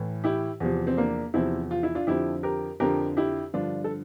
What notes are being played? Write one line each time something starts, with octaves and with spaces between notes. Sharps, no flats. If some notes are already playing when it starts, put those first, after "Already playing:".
Already playing: A2 E3
E4 G4
E2 C3 F3
C4
A#3 D4
E2 C3 F3 C4 E4
F4
E4
D4 F4
F2 D3 F3 E4 G4
G4 A#4
F2 D3 F3 G4 A#4
E4 G4
G2 D3 F3 D4 F4
A4